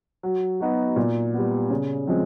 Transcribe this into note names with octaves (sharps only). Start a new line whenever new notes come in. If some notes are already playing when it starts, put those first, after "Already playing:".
F#3
B3 D#4 F#4
A#2
G3 B3
C#3
F3 G#3 C4